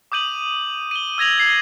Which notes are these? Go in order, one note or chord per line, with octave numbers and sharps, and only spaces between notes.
D6 D#6 G6 D#7 F#7
D#7 G7
E6 G#6 A#6 F7 F#7
G#6 C7 G7